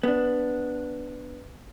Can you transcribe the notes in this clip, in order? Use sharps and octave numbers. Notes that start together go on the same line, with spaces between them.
B3 D4